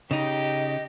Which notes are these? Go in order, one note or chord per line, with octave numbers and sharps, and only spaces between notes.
C#3 D#4 G4 D#5